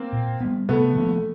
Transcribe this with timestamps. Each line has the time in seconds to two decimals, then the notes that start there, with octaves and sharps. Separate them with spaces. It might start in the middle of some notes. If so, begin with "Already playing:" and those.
Already playing: A#3 C4
0.13 A#2
0.41 G3 B3
0.69 C3 A3 B3
0.96 F3 A#3 C#4